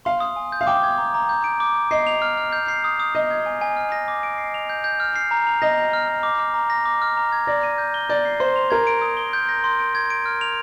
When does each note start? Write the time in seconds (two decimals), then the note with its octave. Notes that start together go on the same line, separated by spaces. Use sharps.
0.05 F5 C6
0.20 D#6
0.36 G#5
0.52 G6
0.61 F5
0.67 G5 D6
0.83 G#6
0.98 A#5
1.14 A#5
1.29 G6
1.44 D7
1.60 D6
1.75 D6
1.91 D#5 C7
2.07 F7
2.22 F6
2.37 F6
2.53 G6
2.68 C7
2.84 D#6
3.00 D#6
3.14 D#5 D#6
3.31 G#6
3.46 G#5
3.61 G#5
3.76 F6
3.92 A#6
4.08 D6
4.23 D7
4.38 C7
4.54 F7
4.69 G6
4.84 G6
5.00 F6
5.16 C7
5.31 A#5
5.47 F7
5.62 D#5 A#6
5.77 F7
5.93 F6
6.08 F6
6.23 D6
6.39 F6
6.54 A#5
6.70 A#6
6.85 D6
7.02 F6
7.17 A#5
7.32 G#6
7.47 D5 A#6
7.63 D#7
7.78 G6
7.94 G7
8.09 D5 G6
8.25 C7
8.40 C5 C6
8.56 F7
8.70 A#4 G#6
8.87 D7
9.02 D#6
9.17 G7
9.33 G6
9.49 A#6
9.64 C6
9.79 D7
9.95 G#6
10.10 D7
10.25 F6
10.41 F7